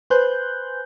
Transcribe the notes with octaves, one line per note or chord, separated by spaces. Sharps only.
B4 C5 G#5 C6 F#6 G6